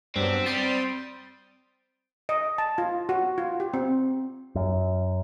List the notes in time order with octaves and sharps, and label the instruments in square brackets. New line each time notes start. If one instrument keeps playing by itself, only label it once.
[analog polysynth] G2 [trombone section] F#3 B3 D4 [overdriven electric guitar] C4 [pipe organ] E5
[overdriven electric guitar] G3 [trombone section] C4 [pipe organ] G5 C6 D#6 [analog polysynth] A6
[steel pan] D#5
A5
F4
F#4
F4
G4
C4
[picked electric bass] F#2